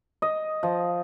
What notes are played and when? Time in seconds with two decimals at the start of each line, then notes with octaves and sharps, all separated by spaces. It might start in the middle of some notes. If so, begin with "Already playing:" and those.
0.22 D#5
0.63 F3